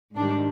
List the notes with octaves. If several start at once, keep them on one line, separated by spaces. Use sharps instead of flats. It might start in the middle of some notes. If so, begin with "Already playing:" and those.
G#2 D#3 G3 D4